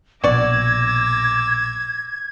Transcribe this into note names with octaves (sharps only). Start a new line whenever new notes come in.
A#1 B2 F#4 D5 D6 E6 G#6 A#6